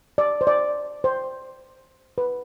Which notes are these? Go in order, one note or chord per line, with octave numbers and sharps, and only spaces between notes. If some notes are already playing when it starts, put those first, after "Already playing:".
D5
C5
D5
C5
B4